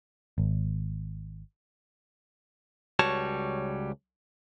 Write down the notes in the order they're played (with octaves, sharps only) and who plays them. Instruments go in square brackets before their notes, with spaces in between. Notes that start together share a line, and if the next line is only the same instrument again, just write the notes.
[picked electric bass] G#1
[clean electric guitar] C#2 G3 F#4 C#5 A5